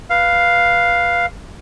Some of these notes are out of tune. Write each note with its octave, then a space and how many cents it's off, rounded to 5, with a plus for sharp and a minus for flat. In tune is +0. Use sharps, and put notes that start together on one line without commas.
B4 -15 F5 +0